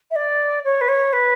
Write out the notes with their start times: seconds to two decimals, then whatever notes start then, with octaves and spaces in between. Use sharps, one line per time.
0.11 E5
0.16 D5
0.65 C#5
0.81 B4
0.88 C#5
1.13 B4